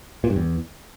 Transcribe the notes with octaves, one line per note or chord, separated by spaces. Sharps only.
A#2
G2
E2